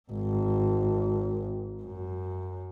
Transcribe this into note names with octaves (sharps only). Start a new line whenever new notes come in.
G#1
F#2